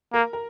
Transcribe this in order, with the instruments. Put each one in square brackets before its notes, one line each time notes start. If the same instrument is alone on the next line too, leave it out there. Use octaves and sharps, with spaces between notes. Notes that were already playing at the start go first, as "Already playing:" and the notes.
[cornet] A#3 [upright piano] A#4
[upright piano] A#4